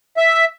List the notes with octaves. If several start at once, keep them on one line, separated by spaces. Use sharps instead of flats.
E5